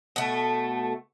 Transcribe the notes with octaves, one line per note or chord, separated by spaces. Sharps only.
B2 A3